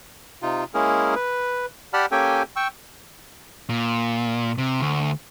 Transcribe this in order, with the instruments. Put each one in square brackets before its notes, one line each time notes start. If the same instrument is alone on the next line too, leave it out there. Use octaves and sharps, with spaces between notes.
[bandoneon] C3 D#4 F4
G#3 A#3 C#4 E4 G#4 A#4
B4
G4 D5 F#5 A5 B5 F6
A#3 C#4 G4 A4 G5 G#5
G5 C#6 E6
[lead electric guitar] A#2
C3
D2